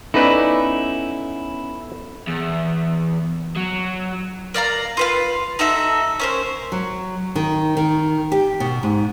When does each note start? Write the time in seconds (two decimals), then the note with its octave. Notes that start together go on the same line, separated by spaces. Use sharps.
0.14 B3 C#4 D#4 E4 A4 B4 D5
2.28 E2
3.56 F#3
4.54 A#4 D5 F5 A#5
4.97 F4 B4 F5
5.59 D#4 F#4 A4 E5
6.20 C#4 A#4 C5
6.72 F#3
7.36 D#3
7.77 D#3
8.32 G4
8.60 B2
8.83 G#2